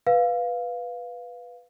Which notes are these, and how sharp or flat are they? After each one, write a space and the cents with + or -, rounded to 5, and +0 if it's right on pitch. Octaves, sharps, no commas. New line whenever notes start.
B4 +0 F5 +0